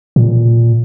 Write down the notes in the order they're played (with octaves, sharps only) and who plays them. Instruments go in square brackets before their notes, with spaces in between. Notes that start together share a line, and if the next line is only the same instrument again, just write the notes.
[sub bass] A#2